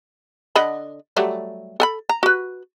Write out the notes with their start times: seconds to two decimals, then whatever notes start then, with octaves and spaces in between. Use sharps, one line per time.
0.56 D3 D#5 B5
1.16 F#3 G3 A3
1.80 A4 G#5 B5
2.09 A#5
2.23 F#4 B4